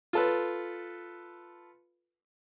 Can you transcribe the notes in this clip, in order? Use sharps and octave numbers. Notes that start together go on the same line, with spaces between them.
F4 A4 B4